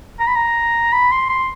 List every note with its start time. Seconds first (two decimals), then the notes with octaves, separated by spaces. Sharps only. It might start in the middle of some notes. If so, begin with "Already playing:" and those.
0.20 A#5
0.27 B5
0.36 A#5
0.93 B5
1.12 C6
1.30 C6